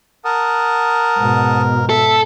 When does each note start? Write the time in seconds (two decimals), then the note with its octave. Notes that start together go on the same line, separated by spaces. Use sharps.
0.25 A#4 F#5 A5 D#6
1.17 G#2 B2
1.89 A4 E5